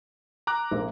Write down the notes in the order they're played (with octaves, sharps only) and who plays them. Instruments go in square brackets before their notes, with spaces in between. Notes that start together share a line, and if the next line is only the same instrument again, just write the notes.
[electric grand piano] A#5 D6 F#6
[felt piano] A#1 A#3